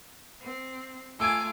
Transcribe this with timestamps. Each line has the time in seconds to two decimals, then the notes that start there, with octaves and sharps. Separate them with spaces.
0.41 C4
1.20 A3 F4 G#5 D6 E6 G#6